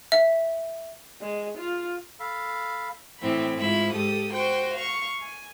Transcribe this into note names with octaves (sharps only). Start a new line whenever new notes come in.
E5
G#3
F4
A4 F5 B5
A2 E3 C4 B5
G#2 E4 F4 B5
G4 A4 D#6
F#4 C5 G5
F5 C#6
G#5